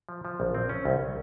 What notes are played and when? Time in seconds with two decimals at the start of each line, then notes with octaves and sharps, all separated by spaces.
0.09 F3
0.25 F3
0.40 A#1
0.55 C4
0.69 C#4
0.85 C2